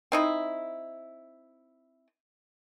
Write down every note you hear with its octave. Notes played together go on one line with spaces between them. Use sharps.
C4 D#4 E4